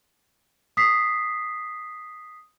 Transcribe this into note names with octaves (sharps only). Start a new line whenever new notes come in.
D#6 B6 C7